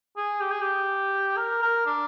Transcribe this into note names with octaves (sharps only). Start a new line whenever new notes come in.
G#4
G4
G#4
G4
A#4
A#4
D4